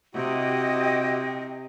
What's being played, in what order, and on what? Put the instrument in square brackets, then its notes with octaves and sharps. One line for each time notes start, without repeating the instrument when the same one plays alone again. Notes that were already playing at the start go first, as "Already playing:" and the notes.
[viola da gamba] C3 [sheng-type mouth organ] E4 F#4 G4 [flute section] D#5 G5